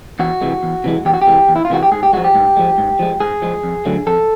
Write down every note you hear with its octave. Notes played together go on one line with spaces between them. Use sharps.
E2 F#4
C3 E3 G#3
E2
C3 E3 G#3
E2 G4
F#4
G4
C3 E3 G#3
E2
E4
F4
C3 E3 G#3 F#4
G4
G#2 G#4
G4
F3 G#3 F#4
G4
G#2
F3 G#3
G#2
F3 G#3
G#2 G#4
F3 G#3
F2
D3 F#3 A3
F2 A4